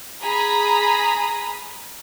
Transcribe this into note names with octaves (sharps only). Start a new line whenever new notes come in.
G#4 A#5 B5 D#6